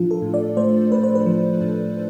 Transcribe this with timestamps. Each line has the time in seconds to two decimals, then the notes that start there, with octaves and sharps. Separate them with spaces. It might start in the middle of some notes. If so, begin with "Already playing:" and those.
Already playing: A2 F3 D4 F4
0.11 A4
0.22 A2
0.34 D5
0.57 A3 C5
0.91 A2 B4
1.04 C5
1.15 B4
1.26 F3
1.61 A2